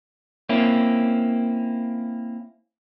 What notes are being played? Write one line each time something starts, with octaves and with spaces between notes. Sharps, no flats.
A#3 C4 C#4 E4